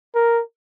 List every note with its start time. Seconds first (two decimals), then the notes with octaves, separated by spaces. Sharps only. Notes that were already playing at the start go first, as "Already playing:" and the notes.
0.15 A#4